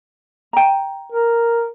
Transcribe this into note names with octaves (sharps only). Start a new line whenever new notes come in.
G5 A#5
A#4